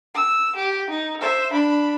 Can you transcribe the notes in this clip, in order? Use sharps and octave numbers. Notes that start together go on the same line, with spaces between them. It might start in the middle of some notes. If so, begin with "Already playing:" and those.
E6
G4
D#4
C5 E5
D4 B5